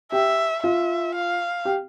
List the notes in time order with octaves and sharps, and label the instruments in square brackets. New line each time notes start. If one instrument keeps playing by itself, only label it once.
[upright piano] G4 [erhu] E5
[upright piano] F4 [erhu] E5
[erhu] F5
[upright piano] G4